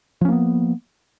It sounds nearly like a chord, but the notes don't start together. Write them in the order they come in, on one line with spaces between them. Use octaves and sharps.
F3 C#4 A#3 B3